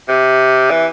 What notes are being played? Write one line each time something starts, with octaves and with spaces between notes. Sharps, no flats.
C3
E3